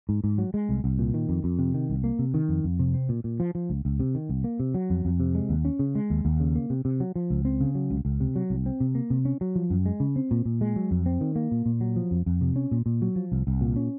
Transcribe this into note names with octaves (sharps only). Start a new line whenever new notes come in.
G#2
G#2
F#3
G#3
C2
C2
A#2
D#3
F2
F2
C3
D#3
C2
A#3
C3
D#3
F2
F2
C3
C4
A#2
A#2
F3
F3
C#2
C#2
C3
D#3
C2
A#3
C3
F#3
F2
F2
C3
G#3
D#2
C#4
C#3
G#3
D#2
D#2
C#3
A#3
C3
C3
F#3
F3
C#2
C4
C#3
F#3
C#2
C#2
C3
F#3
C2
C4
C3
A#3
C3
C#4
F#3
F3
F#2
G#3
C#3
C4
A#2
A#2
G#3
F#3
F2
C4
D#3
A#3
A#2
A#2
F#3
F3
F2
F2
C3
C#4
A#2
A#2
F#3
F3
C2
C2
A#2
C#4